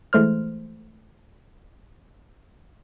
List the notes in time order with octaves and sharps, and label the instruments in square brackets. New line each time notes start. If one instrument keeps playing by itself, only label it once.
[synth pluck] E3 G#3 A3 C5 F6